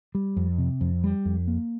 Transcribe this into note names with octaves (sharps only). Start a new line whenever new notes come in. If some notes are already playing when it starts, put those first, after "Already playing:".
G3
F2
C3
F2
G3
F2
A#3